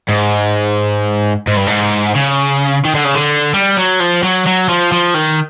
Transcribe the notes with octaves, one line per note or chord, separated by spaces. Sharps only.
G#2
G#2
G2
G#2
C#3
D#3
D3
C#3
D3
G3
F#3
F3
F#3
F#3
F3
F3
D#3